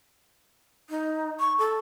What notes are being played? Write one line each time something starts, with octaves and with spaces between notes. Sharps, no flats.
D#4
C#6
A4